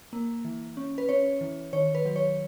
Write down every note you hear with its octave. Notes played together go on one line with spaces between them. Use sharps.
A#3
E3
C#4
B4
C#4 C#5
E3
D#3 C#5
B4
F#3
C#5